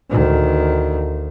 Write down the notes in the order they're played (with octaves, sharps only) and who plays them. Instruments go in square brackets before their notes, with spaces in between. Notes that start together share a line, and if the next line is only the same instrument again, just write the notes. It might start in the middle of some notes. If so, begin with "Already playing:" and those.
[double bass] D2 D#3